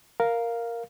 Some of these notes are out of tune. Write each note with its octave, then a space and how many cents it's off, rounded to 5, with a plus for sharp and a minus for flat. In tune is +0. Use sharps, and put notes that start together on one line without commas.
A#4 +0 F5 +0